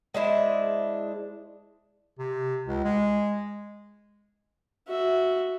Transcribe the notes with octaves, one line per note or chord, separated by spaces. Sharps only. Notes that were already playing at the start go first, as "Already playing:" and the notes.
G#3 D4 E4 C5
C3
C#2
G#3
F#4 E5